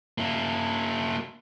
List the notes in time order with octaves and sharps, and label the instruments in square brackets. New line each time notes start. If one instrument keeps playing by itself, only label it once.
[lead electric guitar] A#3 E4